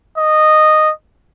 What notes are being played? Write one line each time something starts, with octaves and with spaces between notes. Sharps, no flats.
D#5